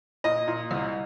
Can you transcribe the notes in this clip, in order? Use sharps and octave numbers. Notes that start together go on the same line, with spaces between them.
A#2 D#5
A#2
C2